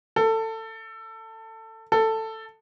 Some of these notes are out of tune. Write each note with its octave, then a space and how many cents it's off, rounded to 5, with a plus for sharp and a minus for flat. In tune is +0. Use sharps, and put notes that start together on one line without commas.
A4 +20
A4 +10